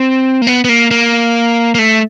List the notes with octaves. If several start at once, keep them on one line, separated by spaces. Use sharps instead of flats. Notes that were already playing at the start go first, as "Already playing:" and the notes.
Already playing: C4
A#3
B3
B3
A#3
A#3
A#3
A3